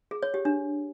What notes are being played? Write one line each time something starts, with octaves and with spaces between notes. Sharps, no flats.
G#4
C#5
G4
D4